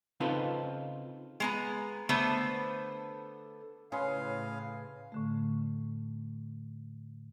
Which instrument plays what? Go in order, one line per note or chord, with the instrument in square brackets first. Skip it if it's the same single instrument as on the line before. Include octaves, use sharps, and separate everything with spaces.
[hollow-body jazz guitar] C#3 C4 D#4 F4 A4 B4
[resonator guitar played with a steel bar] G#3 B3 A#5
D3 A3 B3 A4 C5
[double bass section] A2 C#3 [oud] C#4 [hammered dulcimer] G#4 B4 C6 [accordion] F5
[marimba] A2 D3 A3